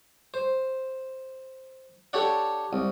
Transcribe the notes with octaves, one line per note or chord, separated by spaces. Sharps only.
C5
D4 G4 A4 C#5 D5 F#5
C2